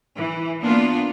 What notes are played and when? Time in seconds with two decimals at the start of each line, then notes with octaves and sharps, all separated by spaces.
0.16 E3
0.62 A#3 B3 D4 F4